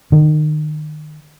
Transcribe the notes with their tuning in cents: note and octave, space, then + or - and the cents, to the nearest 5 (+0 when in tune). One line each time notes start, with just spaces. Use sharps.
D#3 -30